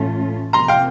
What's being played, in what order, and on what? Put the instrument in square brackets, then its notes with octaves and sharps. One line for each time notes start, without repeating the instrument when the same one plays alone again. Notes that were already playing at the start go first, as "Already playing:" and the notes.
Already playing: [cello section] A2 E3 A3 C#4 F4
[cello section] C3 F3 A#3 [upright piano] A#5 C6
[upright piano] F5 G5